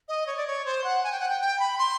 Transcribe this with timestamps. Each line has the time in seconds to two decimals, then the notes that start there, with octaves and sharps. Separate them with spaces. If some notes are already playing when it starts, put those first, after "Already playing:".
0.08 D#5
0.27 C#5
0.37 D5
0.47 C#5
0.65 C5
0.84 F#5
1.04 G#5
1.12 G5
1.20 F#5
1.29 G5
1.41 G5
1.60 B5
1.78 C6